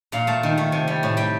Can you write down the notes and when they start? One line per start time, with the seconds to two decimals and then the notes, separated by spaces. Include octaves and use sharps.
0.12 A#2 F5
0.27 A3 A5
0.43 D#3
0.57 A3
0.72 C3
0.87 G3
1.03 A2
1.17 G3 G5